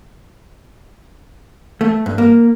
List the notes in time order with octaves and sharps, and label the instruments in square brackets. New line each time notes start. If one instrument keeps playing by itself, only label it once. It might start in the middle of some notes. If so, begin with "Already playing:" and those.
[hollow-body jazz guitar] A3
G2
A#3